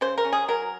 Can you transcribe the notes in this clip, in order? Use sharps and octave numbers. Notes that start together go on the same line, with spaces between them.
C#3 C5
A#4
C#4
G#4
F#3 A#4